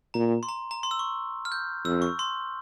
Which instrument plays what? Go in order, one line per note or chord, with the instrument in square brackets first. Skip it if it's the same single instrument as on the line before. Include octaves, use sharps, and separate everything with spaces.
[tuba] A#2 [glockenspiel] A#5
[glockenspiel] C6
A#5
A#5
C6
E6
C#6
F6
G6
[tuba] F2 [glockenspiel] E6
[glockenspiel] C#6
C6